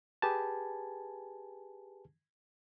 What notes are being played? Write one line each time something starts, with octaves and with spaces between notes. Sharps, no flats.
G4 G#4 B4 G#5 A5